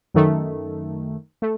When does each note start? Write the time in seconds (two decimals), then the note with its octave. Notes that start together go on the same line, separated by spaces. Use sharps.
0.14 F#2 D#3 A3
1.42 A3